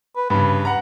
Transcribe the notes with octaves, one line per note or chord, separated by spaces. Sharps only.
B4
G2 C#3 B4
F#5 A#5